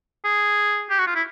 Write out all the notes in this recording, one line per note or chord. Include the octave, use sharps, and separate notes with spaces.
G#4
G4
F#4
F4
E4